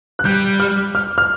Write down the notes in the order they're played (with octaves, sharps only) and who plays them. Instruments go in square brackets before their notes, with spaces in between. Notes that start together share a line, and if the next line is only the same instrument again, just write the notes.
[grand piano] F#6
[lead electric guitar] G3 [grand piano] G6
[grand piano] F6
F6
F6